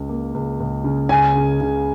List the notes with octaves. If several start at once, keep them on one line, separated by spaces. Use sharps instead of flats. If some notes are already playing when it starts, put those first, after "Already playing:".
Already playing: C#2 C#3
A#3
C#2
C#2
C#3
C#2 G#5
C#3
C#3